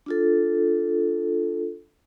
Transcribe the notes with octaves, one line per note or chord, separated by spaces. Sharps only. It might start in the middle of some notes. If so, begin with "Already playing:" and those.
D4 F4 A4